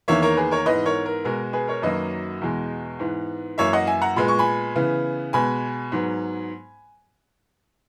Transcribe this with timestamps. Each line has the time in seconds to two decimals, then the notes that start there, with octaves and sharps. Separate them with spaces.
0.08 E2 D#3 A#3 C#5 E5
0.22 A#4 C#5
0.37 G#4 B4
0.51 A#4 C#5
0.66 G#2 E3 B3 B4 D#5
0.86 A#4 C#5
1.06 A#4
1.24 B2 G#3 B3 A#4
1.53 G#4 B4
1.68 A#4 C#5
1.82 F#2 D#3 F#3 A#3 B4 D#5
2.41 E2 B2 G#3
2.99 G#2 E3 B3
3.58 F#2 E3 A#3 C#5 E5
3.73 D#5 F#5
3.87 E5 G#5
4.02 F#5 A#5
4.16 A#2 G#3 B3 B5
4.28 C#6
4.39 G#5 B5
4.76 C#3 E3 B3
5.33 B2 G#3 B3 G#5 B5
5.92 G#2 F#3 B3